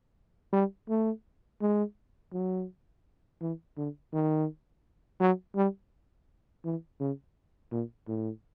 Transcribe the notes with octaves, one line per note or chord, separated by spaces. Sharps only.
G3
A3
G#3
F#3
E3
D3
D#3
F#3
G3
E3
C#3
A#2
A2